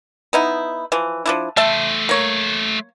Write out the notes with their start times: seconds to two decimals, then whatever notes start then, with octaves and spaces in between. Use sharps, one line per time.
0.33 B3 D#4 E4
0.92 E3 F3
1.26 F3 D4 E4
1.57 A3 C5 E5 A5
2.09 A#3 C#5